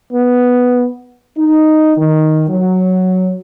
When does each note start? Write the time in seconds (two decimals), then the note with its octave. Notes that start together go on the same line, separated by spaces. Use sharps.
0.13 B3
1.38 D#4
1.96 D#3
2.49 F#3